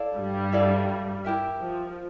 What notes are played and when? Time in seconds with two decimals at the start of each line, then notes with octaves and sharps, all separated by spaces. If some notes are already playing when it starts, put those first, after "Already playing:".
Already playing: E4 A4 D5 F5
0.16 G2 G3
0.52 E4 A4 D5 F5
1.25 E4 G4 A#4 E5
1.61 F3